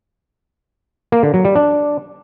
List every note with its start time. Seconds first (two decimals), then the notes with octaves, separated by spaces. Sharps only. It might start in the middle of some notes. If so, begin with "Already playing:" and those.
1.12 A#3
1.23 D3
1.34 F#3
1.45 G3
1.55 D4